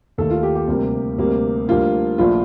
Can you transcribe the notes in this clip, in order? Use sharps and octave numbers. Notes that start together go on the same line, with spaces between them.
D#2 D#3 A3 A4
F4
G4
G4
D2 C3 G3 A#3
D2 C3 G3 A#3
D2 D3 G3 A#3 F4
A#1 A#2 F3 A3 F4